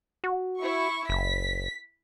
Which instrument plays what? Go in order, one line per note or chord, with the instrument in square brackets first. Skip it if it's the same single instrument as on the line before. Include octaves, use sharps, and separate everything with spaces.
[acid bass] F#4
[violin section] E4 C#6
[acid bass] F#1 [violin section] B6